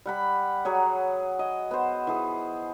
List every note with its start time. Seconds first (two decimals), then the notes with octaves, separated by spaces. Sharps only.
0.06 G3 F#5 B5
0.65 F#3 G#4 C#5
1.39 D#5
1.71 B3 C5
2.07 E3 G#4